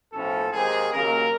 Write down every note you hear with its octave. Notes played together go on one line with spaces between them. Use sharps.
B1 A2 F3 A#3 C#4 A4
D#2 D#3 G#3 C4 G#4
D#2 C#3 F#3 A#3 D#4 A#4